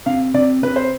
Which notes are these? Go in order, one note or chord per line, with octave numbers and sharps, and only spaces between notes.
C3 F5
C3 D5
C3 B4
C5